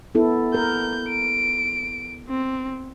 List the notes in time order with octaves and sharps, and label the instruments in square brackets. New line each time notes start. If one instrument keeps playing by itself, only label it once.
[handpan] B3 E4 A4
[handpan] A#4 [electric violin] G6
[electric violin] D7
C4